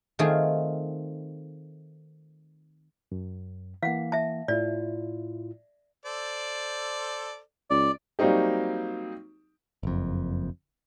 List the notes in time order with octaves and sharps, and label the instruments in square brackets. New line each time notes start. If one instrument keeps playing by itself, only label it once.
[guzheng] D#3 A3 C4 F4 G#4
[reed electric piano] F#2
[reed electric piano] E3 A#3 [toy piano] F5 F#5
[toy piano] E5 A5
[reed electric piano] A2 E4 F4 [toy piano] D5
[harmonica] A4 C5 D5
[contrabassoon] C#2 [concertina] D5
[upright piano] F#3 G3 A#3 C4 D#4 G4
[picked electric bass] F#1 F2